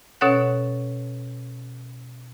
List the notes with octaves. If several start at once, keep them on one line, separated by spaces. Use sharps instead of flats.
B2 C#4 A4 C#5 F#5 F#6